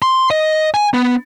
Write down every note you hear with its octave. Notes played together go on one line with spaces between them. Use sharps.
C6
D#5
G#5
B3